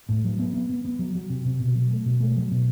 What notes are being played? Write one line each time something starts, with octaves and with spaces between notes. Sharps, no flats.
A2
F#3
B3
B3
B3
B3
F#3
F#3
C3
C3
B2
F#3
A3
B2
A3
F#3
B2